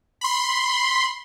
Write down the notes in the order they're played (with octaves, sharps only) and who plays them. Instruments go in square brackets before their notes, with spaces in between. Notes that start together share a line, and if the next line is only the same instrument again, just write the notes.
[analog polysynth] B5 C6